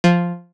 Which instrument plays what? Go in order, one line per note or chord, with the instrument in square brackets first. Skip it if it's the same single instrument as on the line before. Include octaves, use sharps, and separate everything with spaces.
[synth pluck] F3